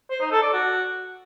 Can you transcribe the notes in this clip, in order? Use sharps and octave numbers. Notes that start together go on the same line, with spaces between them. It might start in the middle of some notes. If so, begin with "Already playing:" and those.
C5
D#4
A4
D5
F#4